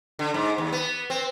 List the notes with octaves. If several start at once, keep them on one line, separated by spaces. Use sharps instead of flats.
D3
G#2
D#2
B3
C4